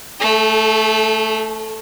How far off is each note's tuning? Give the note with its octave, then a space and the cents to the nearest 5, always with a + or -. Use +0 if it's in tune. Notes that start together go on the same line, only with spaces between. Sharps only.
A3 +0 A4 -35